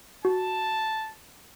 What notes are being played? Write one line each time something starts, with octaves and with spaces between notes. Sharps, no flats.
F#4 A5